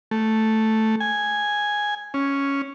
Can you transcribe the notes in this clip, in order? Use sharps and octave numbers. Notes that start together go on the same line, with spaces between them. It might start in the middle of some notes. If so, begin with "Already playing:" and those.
A3
G#5
C#4